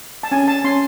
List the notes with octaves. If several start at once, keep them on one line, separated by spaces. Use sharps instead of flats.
A5
C#4 G#5
A5
C#4 C6